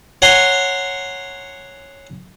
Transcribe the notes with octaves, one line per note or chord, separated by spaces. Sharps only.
C#5 F#5 G#5 A#5 C6